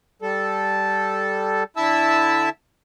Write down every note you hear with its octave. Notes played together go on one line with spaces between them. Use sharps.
G3 A4
D3 E4 E5 A5 E6